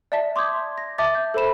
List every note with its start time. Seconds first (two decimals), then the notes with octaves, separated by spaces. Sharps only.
0.12 D5 E5 A5 B6
0.36 C6 D6 D#6 G6 G#6
0.78 A#6
0.98 E5 A5 D6 A6
1.15 G6
1.34 A4 C5 B5 E7